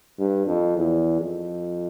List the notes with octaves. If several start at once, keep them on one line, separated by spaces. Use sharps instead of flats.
G2
F2
E2
F2